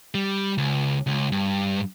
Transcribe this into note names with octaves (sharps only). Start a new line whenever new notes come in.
G3
C#2
C#2
G2